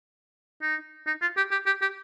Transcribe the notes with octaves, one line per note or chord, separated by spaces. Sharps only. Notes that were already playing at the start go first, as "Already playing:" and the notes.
D#4
D#4
F4
G4
G4
G4
G4